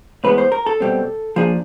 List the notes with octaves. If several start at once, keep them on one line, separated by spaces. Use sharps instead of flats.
A2 E3 G#3 B3 B4
C5
A#4
A4
B2 G3 C4
F3 A#3 D4 G#4